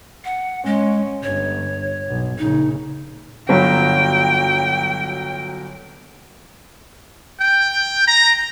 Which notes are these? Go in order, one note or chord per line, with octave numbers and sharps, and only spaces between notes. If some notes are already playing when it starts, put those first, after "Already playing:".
F#5
G#3 C#4
G1 C#5
B1
A#1 C#3 D#4
G1 F#3 G5
G5
A#5